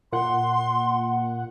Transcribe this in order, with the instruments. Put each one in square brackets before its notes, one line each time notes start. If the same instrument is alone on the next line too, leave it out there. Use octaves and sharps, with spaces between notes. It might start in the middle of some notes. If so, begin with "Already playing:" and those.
[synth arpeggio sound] A#2 F#5 [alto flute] C6